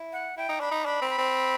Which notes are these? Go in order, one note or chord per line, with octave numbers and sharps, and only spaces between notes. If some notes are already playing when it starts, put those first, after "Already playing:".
Already playing: E4
F#5
E4 G5
D#4
D4 B5
D#4
D4 B5
C4
B5
C4